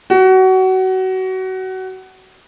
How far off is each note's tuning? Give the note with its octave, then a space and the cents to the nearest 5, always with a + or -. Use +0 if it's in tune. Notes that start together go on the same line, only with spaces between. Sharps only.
F#4 +25